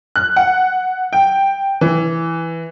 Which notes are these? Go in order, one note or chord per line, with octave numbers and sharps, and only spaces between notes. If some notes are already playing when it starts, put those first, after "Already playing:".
F#6
F#5
G5
E3